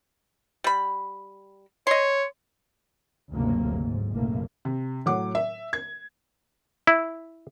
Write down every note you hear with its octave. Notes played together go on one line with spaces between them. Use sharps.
G3 B5
C#5 D#5 C6
F#1 D2 G2 C3 F#3 A#3
G#2
F#1 B1 A2 A3 A#3
C3
A2 F#3 F#5 D6
E5
G#6
E4